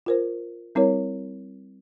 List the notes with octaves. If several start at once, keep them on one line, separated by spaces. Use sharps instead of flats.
F4 A#4 C5
G3 C4 E4 A#4 C#5